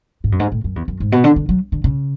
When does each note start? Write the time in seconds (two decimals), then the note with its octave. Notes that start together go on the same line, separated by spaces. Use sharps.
0.24 G#2
0.32 F#2
0.40 G#2
0.52 A2
0.64 F#2
0.76 E2
0.88 F#2
1.00 G#2
1.12 B2
1.24 D3
1.36 D3
1.49 F#3
1.72 D3
1.84 C#3